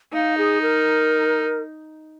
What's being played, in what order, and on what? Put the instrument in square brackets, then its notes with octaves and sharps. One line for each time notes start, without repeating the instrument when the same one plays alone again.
[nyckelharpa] D#4 [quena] F5
[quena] G#4
A#4